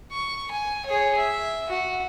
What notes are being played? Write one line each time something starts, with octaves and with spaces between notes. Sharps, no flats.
C#6
G#5
G#4 C#5
E5
F#4